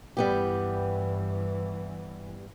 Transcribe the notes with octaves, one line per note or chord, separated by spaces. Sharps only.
G2 E3 G3 B3 G4